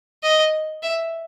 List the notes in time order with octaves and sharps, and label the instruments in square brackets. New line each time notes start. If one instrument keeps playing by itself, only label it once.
[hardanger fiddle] D#5
E5